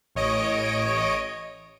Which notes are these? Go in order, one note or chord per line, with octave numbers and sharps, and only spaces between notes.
A1 C#5 D#5 D7